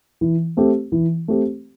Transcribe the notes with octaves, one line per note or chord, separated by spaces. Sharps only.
E3
A3 C4 G4
E3
A3 C4 G4